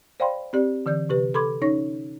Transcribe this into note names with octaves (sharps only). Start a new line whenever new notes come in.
C5 D5 F5 G5 B5 C6
C4 G4 D5
D3 E3 D5 G6
C3 G4 B4
A4 B5 C6 D6 G#6
C#4 D#4 C#5 C#6 A#6